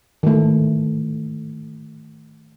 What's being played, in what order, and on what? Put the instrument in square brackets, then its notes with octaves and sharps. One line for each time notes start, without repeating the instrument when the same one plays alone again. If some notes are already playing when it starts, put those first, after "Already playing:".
[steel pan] D#3 A3